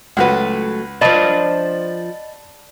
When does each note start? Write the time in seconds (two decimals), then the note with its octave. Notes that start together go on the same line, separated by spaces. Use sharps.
0.17 C#2 F#3 A3 F#4 B4
1.01 F3 D4 D5 D#5 A5 B5 A6